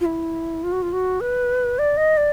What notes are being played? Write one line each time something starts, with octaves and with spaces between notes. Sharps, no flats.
F4
E4
F4
F#4
F4
F#4
B4
D5
D#5
D5